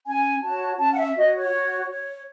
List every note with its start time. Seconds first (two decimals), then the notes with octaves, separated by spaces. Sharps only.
0.07 C#4 G#5
0.43 F#4 C#5 A5
0.79 C#4 A5
0.93 F#5
0.98 E5
1.16 F#4 C#5 D#5
1.35 C#5
1.52 F#4
1.89 C#5